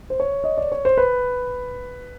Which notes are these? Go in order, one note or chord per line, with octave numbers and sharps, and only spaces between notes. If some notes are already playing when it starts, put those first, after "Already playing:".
C5
C#5
D#5
D5
C#5
C5
B4